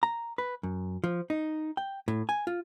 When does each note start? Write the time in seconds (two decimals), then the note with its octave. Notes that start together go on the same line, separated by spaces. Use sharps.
0.03 A#5
0.38 B4
0.63 F#2
1.04 F3
1.30 D#4
1.77 G5
2.08 A2
2.29 G#5
2.47 F4